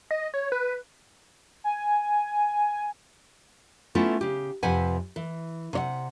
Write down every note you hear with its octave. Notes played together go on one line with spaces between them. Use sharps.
D#5
C#5
B4
G#5
A3 B3 C#4 E4 F4 A4
C#3 G4
F2 C3 B4 F#5 G#5
E3
C3 C#5 F#5